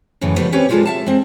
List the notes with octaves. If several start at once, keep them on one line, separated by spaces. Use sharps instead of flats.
F#2 A2 C#3 E3
C#3 F3 G3 A3 B3
C4 C#4 G4 B4 C#5
B2 G3 G#3 F4 A4 A#4
E5 F5 A5
G#3 C4